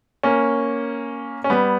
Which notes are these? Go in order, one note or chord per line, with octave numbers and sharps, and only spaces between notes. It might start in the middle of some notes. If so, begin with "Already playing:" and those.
A#3 C#4
C#4
G3 B3